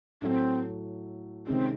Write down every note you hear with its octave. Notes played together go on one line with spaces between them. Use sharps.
A2 F#3 A3 C4 D4
C3 D#3 G#3 C4 C#4